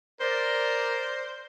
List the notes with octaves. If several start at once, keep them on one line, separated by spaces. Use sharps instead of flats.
A#4 C5 D5